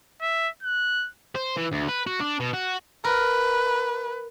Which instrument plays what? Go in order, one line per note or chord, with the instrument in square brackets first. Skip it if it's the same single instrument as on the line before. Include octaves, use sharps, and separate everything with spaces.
[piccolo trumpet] E5
F#6
[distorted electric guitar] C5
E3
D2
B4
F#4
D4
B2
F#4
[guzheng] A#4 [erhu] B4